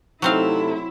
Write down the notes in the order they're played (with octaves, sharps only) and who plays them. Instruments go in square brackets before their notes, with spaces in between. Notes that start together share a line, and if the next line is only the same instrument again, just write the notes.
[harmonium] C3 A3 [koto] F#3 C4 F5 [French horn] D#4 [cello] E4